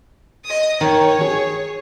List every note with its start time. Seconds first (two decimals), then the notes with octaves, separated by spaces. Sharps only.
0.45 D#5 D#6
0.81 D#3 C#5
1.21 G#4